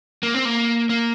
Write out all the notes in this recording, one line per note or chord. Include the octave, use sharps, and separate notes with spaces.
A#3
C4
A#3
A#3